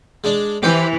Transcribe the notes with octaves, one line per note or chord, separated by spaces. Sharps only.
G#3 D4
E3 G4 C5 E5